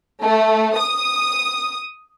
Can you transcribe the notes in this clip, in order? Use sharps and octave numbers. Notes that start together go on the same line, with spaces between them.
A3
D#6